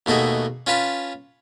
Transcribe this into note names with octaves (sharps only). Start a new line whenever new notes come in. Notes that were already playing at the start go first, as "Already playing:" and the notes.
D#2 B2 A3 F#4 G#4
C#4 F4 B4 A5 B5